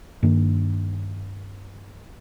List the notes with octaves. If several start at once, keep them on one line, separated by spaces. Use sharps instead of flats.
G2 D#3 A#3